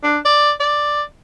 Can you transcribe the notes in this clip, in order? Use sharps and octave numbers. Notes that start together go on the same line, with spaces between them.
D4
D5
D5